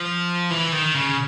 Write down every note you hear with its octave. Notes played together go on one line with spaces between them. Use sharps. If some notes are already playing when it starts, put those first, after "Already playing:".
Already playing: F3
E3
D#3
C#3